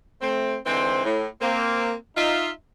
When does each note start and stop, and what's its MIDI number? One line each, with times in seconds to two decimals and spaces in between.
0.22 0.56 57
0.22 0.56 60
0.66 1.04 44
0.66 1.04 50
0.66 1.04 52
0.66 1.04 60
1.05 1.27 45
1.41 1.94 58
1.41 1.94 60
2.16 2.50 63
2.16 2.50 65
2.16 2.50 76